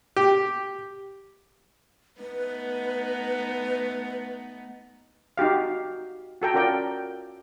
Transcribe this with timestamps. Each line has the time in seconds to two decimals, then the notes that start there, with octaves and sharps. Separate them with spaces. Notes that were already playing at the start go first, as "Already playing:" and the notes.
0.17 G4
2.20 A3 B3 D#4 B4
5.37 D#4 F#4 G4 F5
6.42 F#4 A4 G5 A#5
6.54 C#4 F4 A#4 D5 G5